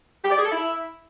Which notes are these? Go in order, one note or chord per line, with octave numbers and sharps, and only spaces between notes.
G4
D5
G#4
A4
E4